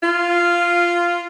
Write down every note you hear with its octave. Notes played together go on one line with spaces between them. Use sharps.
F4